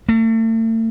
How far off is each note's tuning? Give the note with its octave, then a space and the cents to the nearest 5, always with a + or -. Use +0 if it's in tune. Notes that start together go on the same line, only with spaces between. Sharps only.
A3 +40